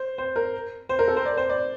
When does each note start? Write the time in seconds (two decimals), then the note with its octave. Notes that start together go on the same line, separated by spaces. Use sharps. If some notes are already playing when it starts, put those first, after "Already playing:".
Already playing: C5
0.18 C5
0.36 A#4
0.89 C5
0.99 A#4
1.08 A4
1.17 C5
1.25 D5
1.37 C5
1.49 D5